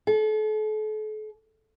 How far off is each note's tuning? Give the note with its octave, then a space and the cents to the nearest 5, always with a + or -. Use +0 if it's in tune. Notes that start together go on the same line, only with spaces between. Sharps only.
A4 -40